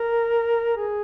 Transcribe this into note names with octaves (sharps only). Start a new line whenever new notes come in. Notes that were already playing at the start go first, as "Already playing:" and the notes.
Already playing: A#4
G#4